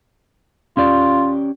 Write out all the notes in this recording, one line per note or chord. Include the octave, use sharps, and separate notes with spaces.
C#4 F4 G4 D5